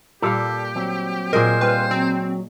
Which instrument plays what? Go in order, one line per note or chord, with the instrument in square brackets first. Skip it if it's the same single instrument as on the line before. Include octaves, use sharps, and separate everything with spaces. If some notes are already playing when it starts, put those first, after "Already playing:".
[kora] A#2 G3 F5 [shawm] G4 [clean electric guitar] A4
[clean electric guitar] F#3 C4
[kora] A#2 G#4 D#5 [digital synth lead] A#4 [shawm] C5
[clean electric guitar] G3 C4 F4 [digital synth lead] B4
[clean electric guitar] F#3 [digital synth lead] C4